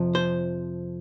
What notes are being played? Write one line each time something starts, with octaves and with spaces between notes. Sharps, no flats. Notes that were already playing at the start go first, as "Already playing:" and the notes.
Already playing: F2 C3 F3
C5